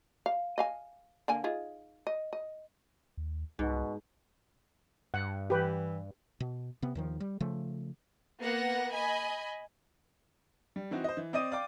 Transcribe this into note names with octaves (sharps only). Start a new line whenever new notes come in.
F5
D#5 F5 G#5
D3 A#3 G#5
D#4 F4 G#4
D#5
D#5
D#2
C2 G#2 B2
G2 F#5
E3 G4 B4
B2
C3 B3
D#2 D#3 F3
G3
C#3 F3 A3
A#3 B3 F#5 A#6
D#5 G#5 B5
G3
E3 C4 D#4 F#4
C5 D#5
E3
C4 D5 D#5 D#6 D#7
D5 F5 G5 D6